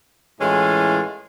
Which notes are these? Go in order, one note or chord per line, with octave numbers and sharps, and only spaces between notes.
A2 E3 G#3 C#4 F4